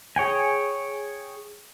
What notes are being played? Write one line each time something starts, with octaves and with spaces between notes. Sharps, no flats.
G#4 C#5 G5 G#5